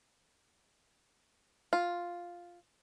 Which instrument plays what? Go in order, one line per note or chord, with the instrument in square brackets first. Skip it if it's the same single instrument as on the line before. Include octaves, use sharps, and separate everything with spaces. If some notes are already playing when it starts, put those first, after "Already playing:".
[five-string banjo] F4